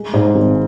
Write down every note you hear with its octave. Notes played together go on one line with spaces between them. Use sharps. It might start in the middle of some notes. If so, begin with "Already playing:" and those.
Already playing: G#3
G#2
G#1